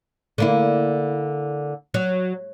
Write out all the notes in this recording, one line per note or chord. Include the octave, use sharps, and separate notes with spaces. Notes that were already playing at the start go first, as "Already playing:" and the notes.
D3 A#3 E4
F#3